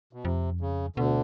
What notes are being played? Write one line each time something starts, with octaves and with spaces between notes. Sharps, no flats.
B2
F2 C3
C#3
D2 B2 D3